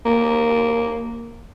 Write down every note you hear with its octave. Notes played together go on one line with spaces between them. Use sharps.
A#3